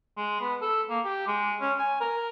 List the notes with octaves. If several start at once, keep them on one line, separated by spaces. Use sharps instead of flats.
G#3
B3
A4
A#3
G4
G#3
C#4
G#5
A#4